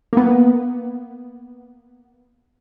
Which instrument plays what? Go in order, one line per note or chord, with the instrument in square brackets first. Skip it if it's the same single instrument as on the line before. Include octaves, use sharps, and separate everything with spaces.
[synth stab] A#3 B3